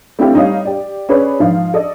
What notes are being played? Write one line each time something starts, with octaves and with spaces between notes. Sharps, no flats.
A3 C4 D4 E4 F4 G4
G3 D#4 G4 C#5 D#5 F5
G4 D5
C#4 G#4 B4 C#5 D5
G#2 F3 F5
A4 D5 D#5